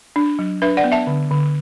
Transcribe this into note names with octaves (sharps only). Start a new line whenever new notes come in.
D4
F#3
D4 B4 E5
D5 F#5
B3
E5 A5
D3
D3